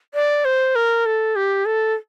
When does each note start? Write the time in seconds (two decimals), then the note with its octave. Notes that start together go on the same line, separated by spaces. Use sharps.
0.14 D5
0.45 C5
0.75 A#4
1.06 A4
1.36 G4
1.65 A4